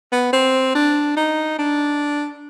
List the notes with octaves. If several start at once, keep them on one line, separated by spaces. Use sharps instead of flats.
B3
C4
D4
D#4
D4